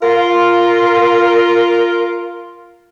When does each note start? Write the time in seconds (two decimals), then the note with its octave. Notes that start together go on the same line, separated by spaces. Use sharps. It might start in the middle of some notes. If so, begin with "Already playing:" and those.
0.02 F4 A#4